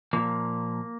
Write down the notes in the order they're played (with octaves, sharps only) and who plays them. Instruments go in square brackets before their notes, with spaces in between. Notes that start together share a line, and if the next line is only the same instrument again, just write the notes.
[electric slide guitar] A#2 F3 A#3